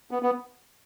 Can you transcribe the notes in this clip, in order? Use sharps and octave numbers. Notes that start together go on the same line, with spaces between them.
B3
B3